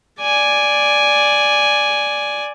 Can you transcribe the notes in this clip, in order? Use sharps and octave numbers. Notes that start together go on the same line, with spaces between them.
D5 G#5